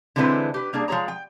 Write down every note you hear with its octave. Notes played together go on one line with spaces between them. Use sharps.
D3 E3 G#3 C4 E4 B4
G4 B4
G3 A#3 D4 G#4
F3 G#3 G#4 C#5 A#5
G5